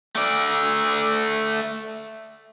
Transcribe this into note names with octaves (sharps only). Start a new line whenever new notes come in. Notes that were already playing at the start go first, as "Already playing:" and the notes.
A3 D5